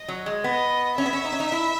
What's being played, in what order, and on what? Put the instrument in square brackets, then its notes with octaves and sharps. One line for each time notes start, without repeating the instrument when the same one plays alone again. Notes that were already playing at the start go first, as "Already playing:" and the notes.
Already playing: [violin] D#5
[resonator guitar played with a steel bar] F#3
G#3
[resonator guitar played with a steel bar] B3 [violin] D#5
[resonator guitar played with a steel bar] C#4 [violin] E5
[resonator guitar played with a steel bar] B3
C#4
D#4
C#4
D#4
E4